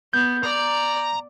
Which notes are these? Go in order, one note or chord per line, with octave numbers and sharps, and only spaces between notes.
B3 G6
D5 A#5